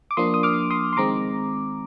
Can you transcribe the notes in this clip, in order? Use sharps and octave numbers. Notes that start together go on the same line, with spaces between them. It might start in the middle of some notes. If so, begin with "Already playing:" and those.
D6
F3 A#3 D4 C6 D#6
D#6
D6 F6
C6 D#6
C6
D#3 G#3 C4 A#5 D6